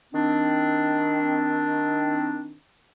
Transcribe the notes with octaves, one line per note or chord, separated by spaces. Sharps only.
D#3 C4 D4